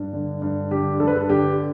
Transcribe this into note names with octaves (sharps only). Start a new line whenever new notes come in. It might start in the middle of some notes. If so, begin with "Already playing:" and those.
Already playing: G2
D3
G2
D3 G4
G2 A4
B4
A4
D3 G4